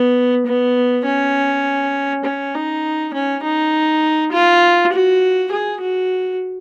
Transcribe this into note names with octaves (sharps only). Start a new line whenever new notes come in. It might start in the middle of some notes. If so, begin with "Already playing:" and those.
Already playing: B3
B3
C#4
C#4
D#4
C#4
D#4
F4
F#4
G#4
F#4